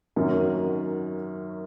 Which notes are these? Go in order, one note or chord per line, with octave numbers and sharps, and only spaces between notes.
F#2 D#3 F#3 C#4